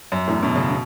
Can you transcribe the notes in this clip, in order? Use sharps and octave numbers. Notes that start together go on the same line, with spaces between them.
F#2
E2 A2
B2
C#3
B2